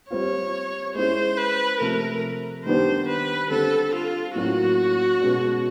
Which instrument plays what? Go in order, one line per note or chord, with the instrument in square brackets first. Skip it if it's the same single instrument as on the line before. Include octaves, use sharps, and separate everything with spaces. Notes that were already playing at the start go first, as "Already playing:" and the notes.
[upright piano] G3 C4 F4 [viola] C#5
[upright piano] G#3 C#4 E4 G#4 [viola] C5
[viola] B4
[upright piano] C3 F3 A3 [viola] A#4
[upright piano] D#3 G3 B3 D4 G4 [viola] C5
[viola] B4
[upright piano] D3 G3 C4 [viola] A4
[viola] F4
[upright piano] A2 F#3 A#3 C#4 F4 [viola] F#4
[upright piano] B2 G#3 C#4